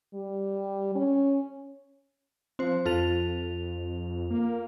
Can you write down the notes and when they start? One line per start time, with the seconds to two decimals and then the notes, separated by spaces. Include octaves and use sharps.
0.14 G3
0.95 C#4
2.59 F3 C4 C5
2.85 F2 F4 A4 F7
4.30 A#3